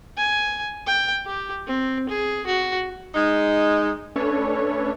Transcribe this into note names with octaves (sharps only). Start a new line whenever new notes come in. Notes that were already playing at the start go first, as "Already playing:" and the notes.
G#5
G5
G4
C4
G#4
F#4
G#3 D#4
A3 C#4 D4 A4 B4 C#5